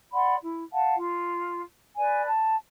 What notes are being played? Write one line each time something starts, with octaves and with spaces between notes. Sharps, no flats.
D5 F#5 B5 C6
E4
F5 F#5 A5
F4
B4 D5 G#5
A5